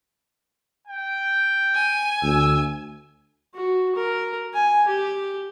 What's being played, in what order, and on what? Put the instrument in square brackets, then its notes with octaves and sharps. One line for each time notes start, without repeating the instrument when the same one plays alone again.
[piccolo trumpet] G5
[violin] G#5
[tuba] D2 [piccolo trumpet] E6
[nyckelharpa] F#4
A#4
G#5
G4